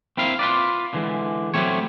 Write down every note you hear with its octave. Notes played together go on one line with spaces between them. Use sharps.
C4 E4 A#4 F5
F4 B4 D5
D3 E3 G#3
F#3 G3 A3 C4 C#5